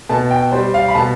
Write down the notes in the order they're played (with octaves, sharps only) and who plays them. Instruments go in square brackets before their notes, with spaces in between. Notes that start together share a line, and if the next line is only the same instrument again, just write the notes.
[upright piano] B2 A5
G5
G3 C5
F5
B5
B2 A5